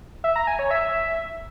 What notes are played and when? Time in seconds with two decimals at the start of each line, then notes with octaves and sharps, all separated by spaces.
0.24 E5
0.36 A#5
0.47 G#5
0.59 C#5
0.71 E5